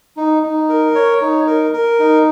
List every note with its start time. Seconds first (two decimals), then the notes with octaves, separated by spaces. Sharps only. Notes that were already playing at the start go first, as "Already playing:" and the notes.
0.17 D#4
0.43 D#4
0.69 A#4
0.95 C#5
1.21 D#4
1.47 A#4
1.73 A#4
1.99 D#4